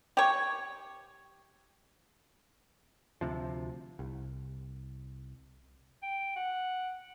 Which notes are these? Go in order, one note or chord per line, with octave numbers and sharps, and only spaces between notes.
G4 C#5
D2 C3 F3
C2
G5
F#5